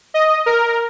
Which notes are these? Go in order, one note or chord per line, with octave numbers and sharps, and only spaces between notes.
D#5
A#4